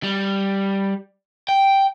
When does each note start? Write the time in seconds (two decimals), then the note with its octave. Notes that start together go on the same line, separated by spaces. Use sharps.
0.03 G3
1.49 G5